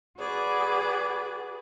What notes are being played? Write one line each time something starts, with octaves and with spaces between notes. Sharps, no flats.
F#4 G#4 B4 D5